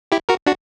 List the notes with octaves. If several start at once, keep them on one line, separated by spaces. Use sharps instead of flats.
E4 G4
F#4 A#4
D4 F#4